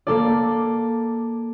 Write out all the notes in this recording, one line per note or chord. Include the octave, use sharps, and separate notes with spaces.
A#3 A4 D5